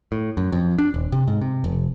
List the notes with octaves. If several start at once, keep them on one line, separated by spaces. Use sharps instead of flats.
A2
F#2
F2
D4
D#1
C3
G#2
C3
F1